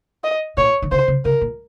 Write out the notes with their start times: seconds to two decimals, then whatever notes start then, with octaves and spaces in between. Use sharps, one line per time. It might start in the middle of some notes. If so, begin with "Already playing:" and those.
0.24 D#5
0.57 A#2 C#5
0.82 D#3
0.91 C#3 C5
1.08 C#3
1.25 C#3 A#4
1.41 A#2